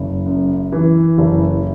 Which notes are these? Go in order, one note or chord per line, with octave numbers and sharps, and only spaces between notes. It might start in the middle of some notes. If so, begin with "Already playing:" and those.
Already playing: F#1
F#2
E3
F#1